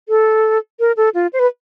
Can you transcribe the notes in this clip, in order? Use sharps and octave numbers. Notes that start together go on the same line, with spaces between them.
A4
A#4
A4
F4
C5
B4